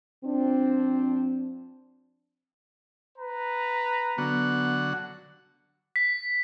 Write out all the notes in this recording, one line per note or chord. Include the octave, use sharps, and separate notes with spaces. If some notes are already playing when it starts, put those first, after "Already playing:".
F3 C4 D4
B4 A#5
D3 F#3 B3 F#5
B6